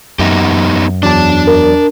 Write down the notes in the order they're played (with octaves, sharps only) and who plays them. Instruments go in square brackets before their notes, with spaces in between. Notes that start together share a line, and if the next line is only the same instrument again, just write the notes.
[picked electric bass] F#2 [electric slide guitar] B3 D#4 G4
[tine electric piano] E2 F#3 D5 [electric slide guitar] D4 A5
[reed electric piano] A#4